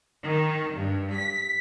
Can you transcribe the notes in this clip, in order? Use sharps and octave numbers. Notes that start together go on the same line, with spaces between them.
D#3
G2
B6